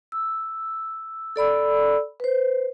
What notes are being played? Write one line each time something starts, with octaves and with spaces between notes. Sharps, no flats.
E6
A4 D5 B5 E6
B4 C5